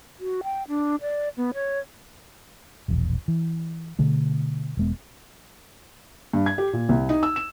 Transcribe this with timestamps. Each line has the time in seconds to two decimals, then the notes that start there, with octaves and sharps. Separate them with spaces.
0.20 F#4
0.43 G5
0.68 D4
1.01 D5
1.37 B3
1.54 C#5
2.88 E1 A#1 E2
3.28 E3
3.99 B2 D3 A3
4.77 E1 G#3 B3
6.33 G2
6.46 G#6
6.58 G4
6.73 A#2
6.89 C2
7.09 D#4
7.23 E6
7.36 E7